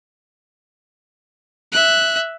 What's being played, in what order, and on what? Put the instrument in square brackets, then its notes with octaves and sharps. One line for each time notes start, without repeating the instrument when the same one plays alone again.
[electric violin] E5 F#6